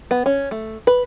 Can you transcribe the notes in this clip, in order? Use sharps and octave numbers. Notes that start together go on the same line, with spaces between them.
B3
C#4
A3
B4